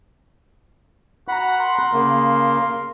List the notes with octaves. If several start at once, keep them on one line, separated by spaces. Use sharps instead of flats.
F#4 F#5 A#5 B5
A#4 C6
C#3 A#3